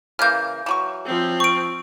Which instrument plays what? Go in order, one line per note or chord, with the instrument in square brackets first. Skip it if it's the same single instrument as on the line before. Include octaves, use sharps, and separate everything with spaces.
[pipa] C#3 E3 A#3 [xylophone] F6 G6
[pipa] E3 F#3 C#6
[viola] F3 C4
[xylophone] C#6 D7